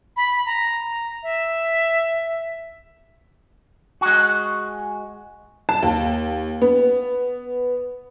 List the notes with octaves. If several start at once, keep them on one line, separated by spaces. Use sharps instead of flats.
B5
A#5
E5
G#3 F#4
A5
D#2
B3